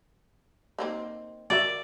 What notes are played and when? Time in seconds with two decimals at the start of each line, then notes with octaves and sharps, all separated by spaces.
0.78 A#3 C4 D#4
1.50 F#4 A#4 D5 E5